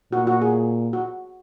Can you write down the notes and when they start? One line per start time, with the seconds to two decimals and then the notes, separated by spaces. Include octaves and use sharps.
0.12 A#2 F#4
0.27 F#4
0.42 G#4
0.93 F#4